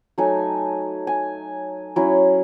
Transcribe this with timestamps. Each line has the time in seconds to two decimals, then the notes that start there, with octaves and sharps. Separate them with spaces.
0.18 F#3 A3 D#4 G#5
1.07 G#5
1.96 F#3 C#4 E4